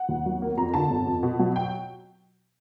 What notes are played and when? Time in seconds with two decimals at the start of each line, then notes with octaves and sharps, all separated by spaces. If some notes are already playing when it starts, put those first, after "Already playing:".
Already playing: F#5
0.09 D#2
0.26 F#3
0.42 A#3
0.57 F2 A#5
0.74 D3 A5
0.91 G1
1.07 F2
1.23 B2
1.39 F#3
1.56 G5